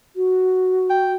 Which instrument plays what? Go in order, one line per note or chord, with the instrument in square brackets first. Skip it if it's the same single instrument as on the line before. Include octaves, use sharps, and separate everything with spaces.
[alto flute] F#4
[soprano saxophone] G5